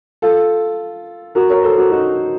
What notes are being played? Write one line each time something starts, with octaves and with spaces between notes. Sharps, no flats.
F4 A4
F#4 A#4
A#4 C#5
A4 C5
F#4 A#4
D#4 F#4